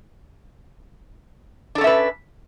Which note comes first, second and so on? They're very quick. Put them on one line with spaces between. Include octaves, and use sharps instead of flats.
D4 A4 C#4 E5 B4